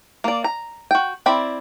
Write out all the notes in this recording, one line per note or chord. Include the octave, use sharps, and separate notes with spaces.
A#3 D5
A#5
F#4 G5
C4 E4 D5 B5